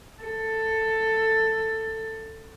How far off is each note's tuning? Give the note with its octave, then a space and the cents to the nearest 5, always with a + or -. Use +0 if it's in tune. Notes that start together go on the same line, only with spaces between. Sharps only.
A4 +10